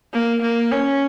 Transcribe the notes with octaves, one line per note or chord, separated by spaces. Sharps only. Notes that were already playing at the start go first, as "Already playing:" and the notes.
A#3
A#3
C#4